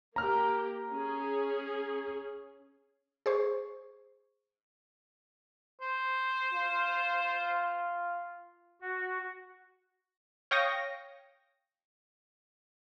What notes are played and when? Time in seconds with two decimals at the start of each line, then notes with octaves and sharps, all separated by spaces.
0.16 A#3 G4 A#5 F6
0.92 C#4 G#4
3.26 G#4 C5 C#6
5.81 C5
6.53 F4
8.81 F#4
10.51 C#5 F5 G5 C#6 D#6 A#6